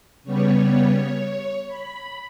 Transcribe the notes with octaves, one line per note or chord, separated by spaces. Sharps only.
C#3 G3 B3 C#5
B5